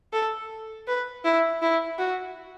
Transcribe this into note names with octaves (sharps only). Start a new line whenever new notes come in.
A4
B4
E4
E4
F#4